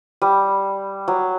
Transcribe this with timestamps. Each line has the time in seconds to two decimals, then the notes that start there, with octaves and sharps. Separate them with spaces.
0.22 G3
1.08 F#3